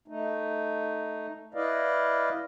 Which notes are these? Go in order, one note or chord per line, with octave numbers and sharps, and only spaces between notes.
A3 D#4
E4 B4 D5 D#5 F5